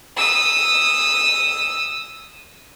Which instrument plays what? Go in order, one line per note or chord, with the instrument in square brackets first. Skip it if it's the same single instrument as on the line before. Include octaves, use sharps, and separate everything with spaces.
[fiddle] D#6 E6